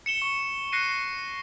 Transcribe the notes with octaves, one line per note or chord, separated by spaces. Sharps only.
C#7 E7 G7
C#6
F#6 A#6 C7 C#7 D#7